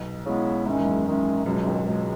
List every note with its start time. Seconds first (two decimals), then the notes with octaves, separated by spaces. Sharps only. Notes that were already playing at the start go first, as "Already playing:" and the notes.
Already playing: B1 B2
0.26 C#3 G#3 B3 E4
0.66 G#1 G#2 D#3 G#3 C#4 E4
0.79 E2
0.86 F#2
1.06 D#3 G#3 C#4 E4
1.45 C#2 F#2 B2 G#3
1.56 F#2
1.66 G#1 G#2
1.85 C#2 B2 G#3